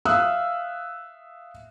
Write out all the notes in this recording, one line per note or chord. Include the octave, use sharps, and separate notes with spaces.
E5 F5 D#6 E6 F#6